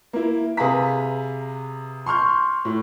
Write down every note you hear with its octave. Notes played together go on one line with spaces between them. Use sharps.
A#3 E4
C3 G#4 B4 F5 A#5 B6
C6 C#6 F6 G6
A2